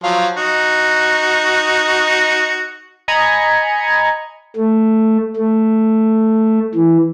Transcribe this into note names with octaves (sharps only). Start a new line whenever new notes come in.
F3 F#3 F5
D#4 F#4
D#5 G#5 A#5 B5 G#6 C#7
A3
A3
E3